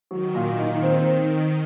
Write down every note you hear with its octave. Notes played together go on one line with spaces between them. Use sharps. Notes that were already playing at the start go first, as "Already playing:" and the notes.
D#3 F#3
A#2
D#4
C4